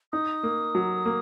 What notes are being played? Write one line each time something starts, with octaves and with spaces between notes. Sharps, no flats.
D#4 D#6
A#3
F#3
A#3